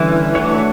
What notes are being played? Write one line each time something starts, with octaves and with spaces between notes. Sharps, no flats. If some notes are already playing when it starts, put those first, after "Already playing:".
Already playing: D3 E3 G3 C#4 G4
A3 D4 F#4 C#5